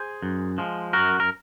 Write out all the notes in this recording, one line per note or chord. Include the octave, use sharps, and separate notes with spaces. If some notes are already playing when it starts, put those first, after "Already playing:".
Already playing: G#4 C5
F#2
F3 G#3
F#2 F#4 A#4
A#4